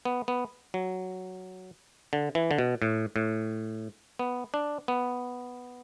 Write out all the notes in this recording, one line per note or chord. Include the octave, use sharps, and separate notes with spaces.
B3
B3
F#3
D3
E3
D3
B2
A2
A2
B3
D4
B3